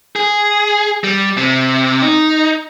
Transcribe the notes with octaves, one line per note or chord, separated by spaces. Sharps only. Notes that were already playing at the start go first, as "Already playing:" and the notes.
G#4
G3
C3
D#4